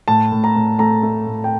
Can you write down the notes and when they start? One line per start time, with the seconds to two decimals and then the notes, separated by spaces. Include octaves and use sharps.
0.08 A2 A5
0.32 A2
0.44 A#5
0.56 A2
0.79 A3 A#5
1.03 A3
1.27 A2
1.44 G5